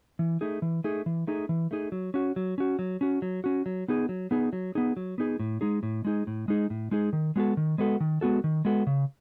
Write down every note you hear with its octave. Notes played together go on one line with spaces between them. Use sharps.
E3
A3 D#4 G#4
E3
A3 D#4 G#4
E3
A3 D#4 G#4
E3
A3 D#4 G#4
F#3
C#4 F#4
F#3
C#4 F#4
F#3
C#4 F#4
F#3
C#4 F#4
F#3
B3 D#4 G#4
F#3
B3 D#4 G#4
F#3
B3 D#4 G#4
F#3
B3 D#4 G#4
A2
G#3 D#4 G#4
A2
G#3 D#4 G#4
A2
G#3 D#4 G#4
A2
G#3 D#4 G#4
D#3
G#3 B3 F#4 A4
D#3
G#3 B3 F#4 A4
D#3
G#3 B3 F#4 A4
D#3
G#3 B3 F#4 A4
C#3